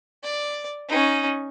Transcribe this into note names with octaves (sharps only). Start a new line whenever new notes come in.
D5
C#4 D#4